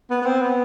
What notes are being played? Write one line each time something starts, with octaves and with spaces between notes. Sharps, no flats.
B3
B3
C4
B3